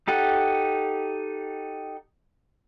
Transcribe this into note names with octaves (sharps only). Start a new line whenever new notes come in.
D#4 G4 A4 F#5